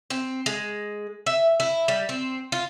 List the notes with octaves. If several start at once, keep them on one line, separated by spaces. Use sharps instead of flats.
C4
G#3
E5
E4
G3
C4
F4